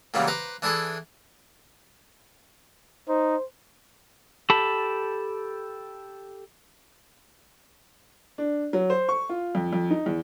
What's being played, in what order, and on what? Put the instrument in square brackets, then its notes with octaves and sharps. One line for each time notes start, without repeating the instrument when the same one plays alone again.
[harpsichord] A#2 C#3 E3 F#3 G3 A#3
B4 C5 A#5 D6
E3 D4 E4 G#4 A4
[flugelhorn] D#4 [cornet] C5
[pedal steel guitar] G4 A4 A5 B5
[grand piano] D4
F#3
C5
C#6
F4
F2
F2
D#4
E2